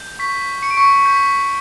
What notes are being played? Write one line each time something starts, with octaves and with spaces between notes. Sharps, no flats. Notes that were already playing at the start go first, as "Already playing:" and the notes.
Already playing: G6
C#6 B6
C#6 C#7
D7
C#6 C#7
G6 B6